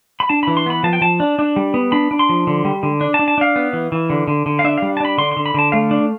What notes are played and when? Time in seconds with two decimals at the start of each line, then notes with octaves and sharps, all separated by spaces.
0.20 B5
0.29 D4 A5
0.43 B5
0.47 E3
0.57 C6
0.66 B3 B5
0.83 F3 A5
0.93 G5
1.01 F3 A5
1.20 D4
1.39 D4
1.56 G3
1.74 B3
1.92 D4 B5
2.11 D4
2.19 C6
2.29 F3
2.47 D3
2.65 G3
2.83 D3
3.01 D4
3.14 A5
3.19 D4
3.28 A5
3.38 D4 F5
3.56 B3
3.73 E3
3.92 E3
4.10 D3
4.28 D3
4.46 D3
4.59 F5
4.64 D4 E5
4.78 F5
4.82 G3
4.97 A5
5.00 D4 B5
5.18 D3 C6
5.32 C6
5.37 D3
5.46 B5
5.54 D3 A5
5.72 A3 F5
5.91 D4